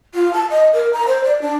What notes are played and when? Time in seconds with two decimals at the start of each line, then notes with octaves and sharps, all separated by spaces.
0.14 F4
0.34 A5
0.50 D#5
0.73 A#4
0.93 A#5
1.07 C5
1.24 D5
1.42 D4